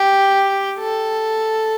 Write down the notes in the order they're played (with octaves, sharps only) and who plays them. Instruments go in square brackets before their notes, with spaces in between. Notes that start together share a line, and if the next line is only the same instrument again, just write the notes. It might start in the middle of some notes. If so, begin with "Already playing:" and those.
Already playing: [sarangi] G4
A4